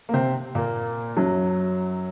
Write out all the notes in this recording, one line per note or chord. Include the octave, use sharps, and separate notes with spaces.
A#3
C3 C4
A#2 A#3
F#2 F#3